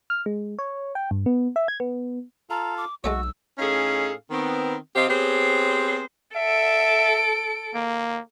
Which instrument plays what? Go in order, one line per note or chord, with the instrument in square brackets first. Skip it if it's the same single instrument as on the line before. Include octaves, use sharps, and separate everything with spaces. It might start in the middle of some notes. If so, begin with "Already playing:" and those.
[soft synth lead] F6
G#3
C#5
G5
G2
B3
E5
G#6
B3
[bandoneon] F4 A4 F5 [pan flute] A#5
[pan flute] D6
[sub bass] B1 [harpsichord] G#3 A3 C#5 [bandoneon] F#4 [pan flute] E6
[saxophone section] A2 C#4 D#4 G#4 A4 F5
D#3 B3 C4
C3 C4 G4 C5 D#5 F5
B3 C4 G4 G#4 C5 C#5
[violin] A4 D7 [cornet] E5
[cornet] A#3